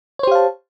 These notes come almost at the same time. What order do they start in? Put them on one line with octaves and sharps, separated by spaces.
C#5 C5 G4 F5 A5